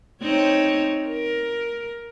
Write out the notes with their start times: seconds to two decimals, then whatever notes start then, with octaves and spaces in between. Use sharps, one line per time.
0.22 C4 D#4 C#5
1.09 A#4